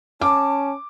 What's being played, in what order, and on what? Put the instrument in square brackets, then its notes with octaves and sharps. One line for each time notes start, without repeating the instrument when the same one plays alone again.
[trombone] C#4 [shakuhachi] A5 [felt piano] D6